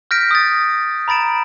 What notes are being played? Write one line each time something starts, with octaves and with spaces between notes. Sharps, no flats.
F6 G6 A#6 B6 D7
D#6 A6
A#5 B5 A6 D7 E7